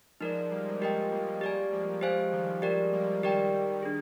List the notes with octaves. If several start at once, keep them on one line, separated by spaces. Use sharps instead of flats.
F3 G#3 D#4 A#4 D5
G3 A#3
F3 G#3 G4 A#4 D#5 G5
G3 A#3
G4 D5 G#5
F3 G#3
G4 C5 F5 G#5
D#3 G3
F3 G#3 G4 A#4 D5
G3 A#3
D#3 G3 G4 A#4 D5 G5
D4 G#4